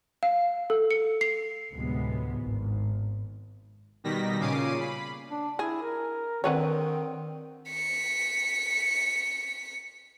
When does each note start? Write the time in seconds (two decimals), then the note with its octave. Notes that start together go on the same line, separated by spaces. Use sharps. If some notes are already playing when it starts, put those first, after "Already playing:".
0.23 F5
0.70 A4
0.91 C#7
1.21 C7
1.72 D2 A2 C3 F#3 G#3 B3
2.40 G#1
4.04 B2 D#3 G3 A#6 B6
4.40 A#2 C#3 C#4 D6 C7 D#7
4.80 B5
5.31 D4
5.59 E4 G#4
5.82 A#4
6.44 D3 D#3 C4 B4 C#5
7.69 B6 C#7